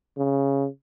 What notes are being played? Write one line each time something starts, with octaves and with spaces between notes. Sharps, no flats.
C#3